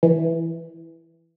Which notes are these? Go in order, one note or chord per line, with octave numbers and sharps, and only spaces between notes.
E3